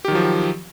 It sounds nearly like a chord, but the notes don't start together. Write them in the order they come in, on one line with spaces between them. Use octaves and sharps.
G4 D#3 F#3 F3